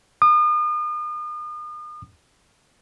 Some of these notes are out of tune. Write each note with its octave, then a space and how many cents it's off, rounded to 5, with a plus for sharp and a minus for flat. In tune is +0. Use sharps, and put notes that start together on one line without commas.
D#6 -40